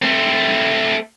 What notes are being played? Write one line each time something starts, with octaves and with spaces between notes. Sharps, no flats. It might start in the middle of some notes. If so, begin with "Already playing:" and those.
A3 C4